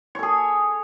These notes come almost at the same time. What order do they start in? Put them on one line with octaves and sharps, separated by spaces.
C#5 A4 G#4